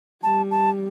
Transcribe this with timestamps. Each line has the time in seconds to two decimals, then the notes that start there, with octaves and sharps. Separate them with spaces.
0.23 G3 A5
0.51 A5